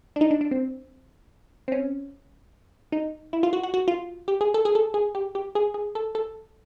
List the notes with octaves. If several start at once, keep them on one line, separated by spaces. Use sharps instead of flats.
D4
D#4
D4
D4
C4
C4
C#4
D#4
E4
F4
F#4
F#4
F#4
F4
G4
G#4
A4
G#4
A4
G#4
G4
G4
G#4
G#4
A4
A4